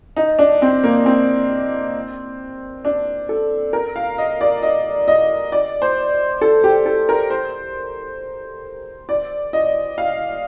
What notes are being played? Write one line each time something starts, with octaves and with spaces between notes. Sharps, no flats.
D#4
D4
C4
A#3
C4
D4
A4
A#4
F5
D#5
D5
D#5
D#5
D5
C5
A4
G4
A4
A#4
C5
D5
D#5
F5